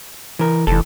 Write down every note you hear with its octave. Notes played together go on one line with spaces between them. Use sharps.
E3 A#4
F1 E3 A4